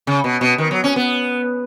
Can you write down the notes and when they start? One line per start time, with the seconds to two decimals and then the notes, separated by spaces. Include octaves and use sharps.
0.07 C#3
0.24 B2
0.41 B2
0.58 D#3
0.71 F#3
0.84 C#4
0.96 B3